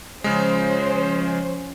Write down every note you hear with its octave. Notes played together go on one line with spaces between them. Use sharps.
C#3 F3 G#3 C#4 C5